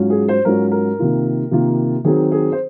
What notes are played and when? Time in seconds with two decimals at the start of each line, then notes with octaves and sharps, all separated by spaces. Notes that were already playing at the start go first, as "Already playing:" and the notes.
Already playing: G#2 F#3 C#4 F4
0.10 G#4
0.28 C5
0.45 G#2 F#3 C#4 F4 A#4
0.71 A#4
0.99 C3 D#3 A#3 F4
1.51 C3 D#3 A#3 F4
2.05 D#3 F#3 C4 G#4
2.32 G#4
2.52 C5